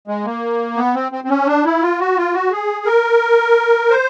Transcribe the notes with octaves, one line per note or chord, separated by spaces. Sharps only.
G#3
A#3
B3
C4
C4
C4
C#4
D4
E4
F4
F#4
F4
F#4
G#4
A#4
C5